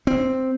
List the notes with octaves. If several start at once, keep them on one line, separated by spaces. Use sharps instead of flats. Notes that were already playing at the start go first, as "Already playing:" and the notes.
C4